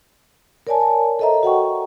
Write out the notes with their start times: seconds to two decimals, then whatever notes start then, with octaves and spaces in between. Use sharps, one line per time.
0.67 A#4 C#5 D5 G#5 A5
1.19 A4 C5 D#5 E5 A#5
1.43 F#4 F#5 G5 C#6